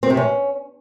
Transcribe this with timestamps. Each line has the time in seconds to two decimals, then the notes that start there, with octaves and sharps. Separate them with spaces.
0.03 C4
0.10 C3
0.17 C#4